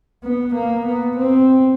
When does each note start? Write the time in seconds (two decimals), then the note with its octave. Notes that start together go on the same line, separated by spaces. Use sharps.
0.24 B3
0.55 A#3
0.86 B3
1.17 C4